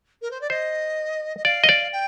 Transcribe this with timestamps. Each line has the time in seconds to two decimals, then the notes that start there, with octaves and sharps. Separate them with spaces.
0.22 A#4
0.31 C5
0.41 D5
0.50 C5 D#5
1.37 D#5
1.45 D5 F5
1.64 D#5
1.69 D5
1.92 G5